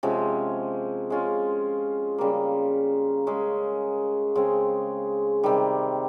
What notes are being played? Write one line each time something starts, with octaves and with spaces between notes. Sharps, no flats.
C3 F3 G#3 C#4
G#3 C#4 F4
C#3 G3 A#3
G#3 C#4 G#4
C#3 G#3 C4
C3 D#3 G3